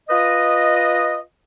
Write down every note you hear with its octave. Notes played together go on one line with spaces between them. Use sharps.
F4 B4 D#5